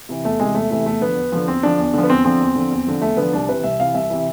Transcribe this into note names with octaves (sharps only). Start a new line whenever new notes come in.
C3 E3
E2 A3
C3 E3 G#3
E2 A3
C3 E3 A3
E2 A3
D3 F3 B3
E2
D3 F3
E2 C4
D3 F3 D4
E2
D3 F3
B3
E2 C4
D3 F3 C4
E2
D3 F3
E2
D3 F3
E2 A3
D3 F3 B3
C2 D4
C3 E3 B4
C2 E5
C3 E3 F5
C2 E5
C3 E3